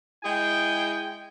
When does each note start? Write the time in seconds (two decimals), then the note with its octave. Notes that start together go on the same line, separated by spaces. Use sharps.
0.23 G#3 E4 G#4 G5